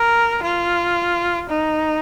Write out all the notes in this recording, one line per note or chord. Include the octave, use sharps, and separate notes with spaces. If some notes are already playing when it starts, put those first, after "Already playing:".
Already playing: A#4
F4
D#4